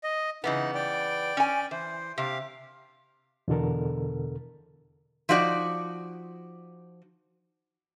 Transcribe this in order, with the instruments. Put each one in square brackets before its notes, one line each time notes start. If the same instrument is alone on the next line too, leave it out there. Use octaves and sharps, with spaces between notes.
[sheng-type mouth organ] D#5
[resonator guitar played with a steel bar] C#3 E3 B3 [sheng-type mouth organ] D#4
[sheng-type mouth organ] D5 G5
[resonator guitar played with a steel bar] C#4 G#5
[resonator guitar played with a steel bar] E3 [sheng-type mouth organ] C5
[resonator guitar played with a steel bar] C3 [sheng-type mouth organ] G4 F5
[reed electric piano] E2 B2 D3 A4 A#4
[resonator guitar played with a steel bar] F3 D#4 F#4 D5